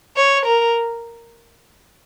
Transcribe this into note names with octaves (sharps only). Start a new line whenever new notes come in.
C#5
A#4